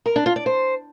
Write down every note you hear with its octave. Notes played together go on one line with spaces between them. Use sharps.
A#4
D4
F4
D5
C5